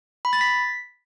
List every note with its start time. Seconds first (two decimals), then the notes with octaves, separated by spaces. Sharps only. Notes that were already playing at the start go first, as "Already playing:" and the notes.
0.25 B5
0.33 A6
0.41 B6